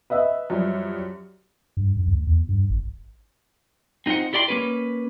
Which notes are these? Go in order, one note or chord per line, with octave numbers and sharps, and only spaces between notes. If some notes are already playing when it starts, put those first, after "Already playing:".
B4 D#5 E5
F#2 F3 G3
G2
F#2
D2
E2
G2
G#1
C4 D#4 F4 C5 F#5
E4 G4 D5 G5 B5 C6
A#3 C#4 B4